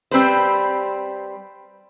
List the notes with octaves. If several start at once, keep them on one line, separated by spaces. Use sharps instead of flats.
G3 C4 B4 C5